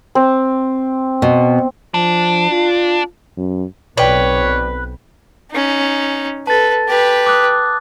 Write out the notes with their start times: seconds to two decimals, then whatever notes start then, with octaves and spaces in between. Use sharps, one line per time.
0.15 C4
1.22 B2
1.94 F3 D4
2.51 F4
3.37 F#2
3.97 B1 B2 C4 B4 C#5 D5 G5
5.52 C#4 D#4
6.47 A4 B4 A5 A6
6.88 G4 B4
7.26 D6 D#6 F#6